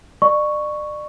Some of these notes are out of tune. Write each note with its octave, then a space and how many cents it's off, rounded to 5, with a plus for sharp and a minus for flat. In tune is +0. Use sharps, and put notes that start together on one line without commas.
D5 +35 C#6 +0